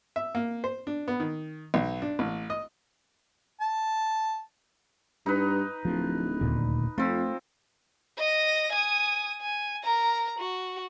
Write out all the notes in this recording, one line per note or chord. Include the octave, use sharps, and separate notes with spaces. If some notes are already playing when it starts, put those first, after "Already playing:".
E5
A#3
C5
D4
B3
D#3
B1
D4
A1
D#5
A5
G2 D#4 B4
D1 F3
D#1 D2 A#2
F2 F3 A3 C4
D#5 A#6
G#5 D#6
G#5
A#4 A#5
F#4